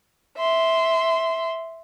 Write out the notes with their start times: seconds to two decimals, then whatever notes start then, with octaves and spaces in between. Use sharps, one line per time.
0.37 E5 C6